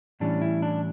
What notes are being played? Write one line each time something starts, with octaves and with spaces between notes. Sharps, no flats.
A2 E3 G3 C#4 D4
E4
D4